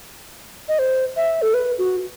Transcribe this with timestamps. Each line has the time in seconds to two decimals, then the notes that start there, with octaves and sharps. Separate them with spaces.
0.69 D#5
0.79 C5
1.17 E5
1.42 A4
1.54 B4
1.78 F#4